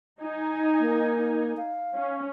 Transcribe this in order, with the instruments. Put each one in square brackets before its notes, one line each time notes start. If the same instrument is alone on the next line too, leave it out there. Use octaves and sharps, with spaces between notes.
[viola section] D#4 G#5
[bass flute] A#3
F5
[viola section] C#4